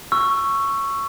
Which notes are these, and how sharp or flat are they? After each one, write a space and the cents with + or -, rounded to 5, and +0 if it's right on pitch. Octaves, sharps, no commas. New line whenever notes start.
C#6 +0 E6 +20